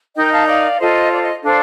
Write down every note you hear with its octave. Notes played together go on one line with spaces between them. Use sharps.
D#4 A#4 D#5 G5
F5 A5
D5 F5
F4 A4 C5 D#5
D5
D#5
D4 A4 C5 D5 F5